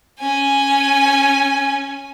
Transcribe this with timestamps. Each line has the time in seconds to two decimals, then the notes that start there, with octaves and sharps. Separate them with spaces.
0.19 C#4 G#5